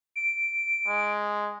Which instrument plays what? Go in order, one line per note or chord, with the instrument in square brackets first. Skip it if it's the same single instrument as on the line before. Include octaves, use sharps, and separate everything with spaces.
[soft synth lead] D7
[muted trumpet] G#3